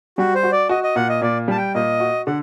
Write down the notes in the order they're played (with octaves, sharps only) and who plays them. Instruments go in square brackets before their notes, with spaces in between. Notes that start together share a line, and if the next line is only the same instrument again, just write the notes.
[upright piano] G3 [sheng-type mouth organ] F#4
[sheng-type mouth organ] C5
[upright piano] F#4
[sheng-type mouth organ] D5
[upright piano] F#4 [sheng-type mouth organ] D#5
[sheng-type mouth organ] D#5
[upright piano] A#2 [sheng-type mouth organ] F#5
[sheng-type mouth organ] D#5
[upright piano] A#2 [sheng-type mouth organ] D5
[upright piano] G3 [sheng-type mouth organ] A5
[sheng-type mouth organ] G5
[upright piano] A#2 [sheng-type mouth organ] D#5
[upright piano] F#4
[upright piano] D3 [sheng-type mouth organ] F#5